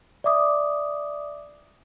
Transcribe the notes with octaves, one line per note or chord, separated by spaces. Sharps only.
D5 E5 D6 D#6